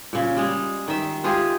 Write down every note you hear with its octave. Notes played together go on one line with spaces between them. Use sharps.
A#2 C#3
G3 G#3
D#3 E5
G#3 F4 G4 G#4